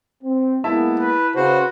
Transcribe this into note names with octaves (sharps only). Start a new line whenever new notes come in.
C4
G#3 A#3 B3 E4 E5 A5
B4
C#3 F#4 B4 C5